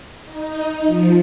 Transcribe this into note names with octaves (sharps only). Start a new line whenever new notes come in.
D#4
F3